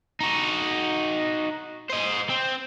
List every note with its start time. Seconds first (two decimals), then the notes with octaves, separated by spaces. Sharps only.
0.20 D#4 F#4
1.90 C5 D#5
2.29 C4